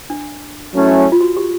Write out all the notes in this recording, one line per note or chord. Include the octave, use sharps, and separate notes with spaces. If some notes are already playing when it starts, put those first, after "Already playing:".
D4
F#3 A3 C#4 E4
F4
F#4
G4